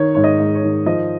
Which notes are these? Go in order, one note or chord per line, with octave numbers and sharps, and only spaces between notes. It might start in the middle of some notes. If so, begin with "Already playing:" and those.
Already playing: D#3 C#5
G#2 C#5
D#5
G#2
C#5
D#3
F3 D#5